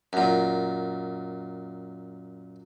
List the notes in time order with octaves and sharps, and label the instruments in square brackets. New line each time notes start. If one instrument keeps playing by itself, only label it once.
[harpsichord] F#2 A#2